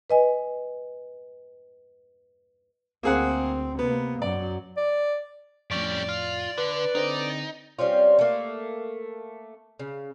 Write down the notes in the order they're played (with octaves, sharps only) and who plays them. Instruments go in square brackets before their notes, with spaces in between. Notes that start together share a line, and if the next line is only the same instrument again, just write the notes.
[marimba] B4 D#5 G#5
[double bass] D2 C4 [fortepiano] A#3 G#4 F#5
[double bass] C3 A#3 [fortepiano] B3
[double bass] F#2 F#3 [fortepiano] D5
[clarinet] D5
[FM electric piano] F2 A2 [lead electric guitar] G3 C#4 [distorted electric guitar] D5
[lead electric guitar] F4
[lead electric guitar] D3 [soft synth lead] B4
[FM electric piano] D3 C4 [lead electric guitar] D#4
[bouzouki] G3 C4 C#4 F4
A3 A#3
C#3